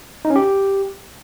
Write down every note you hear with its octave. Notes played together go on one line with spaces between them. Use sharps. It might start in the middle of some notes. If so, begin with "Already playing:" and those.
D#4
C#4
G4